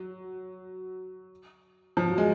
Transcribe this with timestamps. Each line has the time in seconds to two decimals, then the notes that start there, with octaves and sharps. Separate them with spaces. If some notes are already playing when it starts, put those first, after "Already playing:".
Already playing: F#3
1.97 F3
2.08 F#3
2.18 G#3